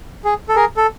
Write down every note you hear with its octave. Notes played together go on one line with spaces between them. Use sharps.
G#4
A4
G#4 A#4
A4